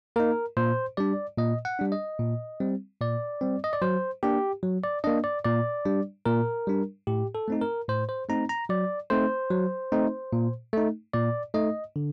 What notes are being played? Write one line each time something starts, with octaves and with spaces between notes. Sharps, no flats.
A#3 D#4 A#4
A#2 C5
G3 D4 D5
A#2 D#5
F#5
G3 D4
D#5
A#2
G3 C4
A#2 D5
G3 C4
D#5
D5
F#3 C5
A#3 D4 G4
F#3
D5
A#3 D4 D#5
D5
A#2 D5
G3 D4
A#2 A#4
G3 D4
A2 G4
A4
A3 C4 D#4
A#4
A2 C5
C5
A3 C4 D#4 A#5
A#5
F#3 D5
A3 C4 D#4 C5
F#3
A3 C4 D#4
A#2
A3 D#4
A#2 D5
A3 D#4 D#5
D3